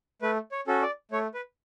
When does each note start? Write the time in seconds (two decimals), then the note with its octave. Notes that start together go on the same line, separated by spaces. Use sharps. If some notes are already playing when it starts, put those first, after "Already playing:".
0.22 A3 B4
0.52 C#5
0.67 C#4 F#4 A4
0.82 D5
1.11 A3 C#5
1.34 B4